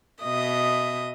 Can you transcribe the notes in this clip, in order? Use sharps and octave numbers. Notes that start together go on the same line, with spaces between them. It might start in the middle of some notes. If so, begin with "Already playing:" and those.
B2 D#5 E5 D#6